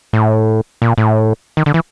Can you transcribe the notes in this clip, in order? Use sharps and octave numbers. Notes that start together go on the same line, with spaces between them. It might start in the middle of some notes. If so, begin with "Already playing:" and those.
A2
A#2
A2
D#3
D3
E3